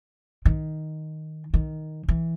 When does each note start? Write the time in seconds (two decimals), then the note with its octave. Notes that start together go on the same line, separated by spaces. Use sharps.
0.45 D#3
1.54 D#3
2.08 E3